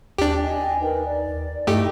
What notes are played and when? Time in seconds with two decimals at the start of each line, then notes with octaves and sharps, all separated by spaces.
0.18 D#2 D4 G4
0.42 D#5 G5 G#5
0.80 D#4 A#4 B4
1.04 D5
1.67 G2 A3 D#4 E4 G4 D#5